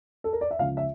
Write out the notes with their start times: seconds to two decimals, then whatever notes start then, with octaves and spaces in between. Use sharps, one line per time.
0.24 A4
0.33 A#4
0.41 D5
0.51 E5
0.59 C#2 C#3 F3 F5
0.77 E5